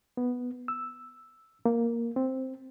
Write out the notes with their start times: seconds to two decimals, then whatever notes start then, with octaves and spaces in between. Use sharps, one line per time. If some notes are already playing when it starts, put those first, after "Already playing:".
0.17 B3
0.68 E6
1.66 A#3
2.16 C4